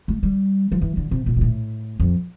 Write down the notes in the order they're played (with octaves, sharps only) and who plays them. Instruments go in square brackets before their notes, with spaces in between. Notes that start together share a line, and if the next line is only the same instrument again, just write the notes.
[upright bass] A3
G3
F3
E3
D3
C3
A#2
A#2
A2
F2